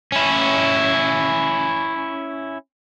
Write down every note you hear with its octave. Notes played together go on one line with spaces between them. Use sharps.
C#4 E4